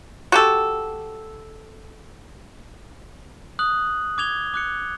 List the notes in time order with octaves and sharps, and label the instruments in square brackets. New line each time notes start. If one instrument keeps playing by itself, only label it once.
[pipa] F#4 G4 A4
[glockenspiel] D#6 F#6 F#7
D6 G#6 F7 G7
D6 F#6 C#7